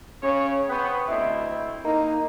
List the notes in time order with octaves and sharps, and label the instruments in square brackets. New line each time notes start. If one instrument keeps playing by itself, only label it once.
[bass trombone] C#3 [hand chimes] C#4 [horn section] C#5
[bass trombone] B3 [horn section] G#4 B4 C5 [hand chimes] G5 C#6
[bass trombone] D2 [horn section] C4 E4 [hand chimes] D#5 E5
[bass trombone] A#3 [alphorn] D#4 [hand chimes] A#4 A#5